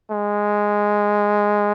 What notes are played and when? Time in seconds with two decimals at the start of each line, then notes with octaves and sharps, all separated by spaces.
0.11 G#3